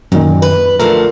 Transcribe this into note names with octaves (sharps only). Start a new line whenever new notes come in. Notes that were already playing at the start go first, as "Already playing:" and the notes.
F#2 A#2 D#3
B4
D3 F3 A3 A#4